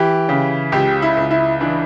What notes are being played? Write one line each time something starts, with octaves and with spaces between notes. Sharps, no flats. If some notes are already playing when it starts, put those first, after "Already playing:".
Already playing: E3 G4
C#3
C#2 G4
E4
C#2
E4
E3 D4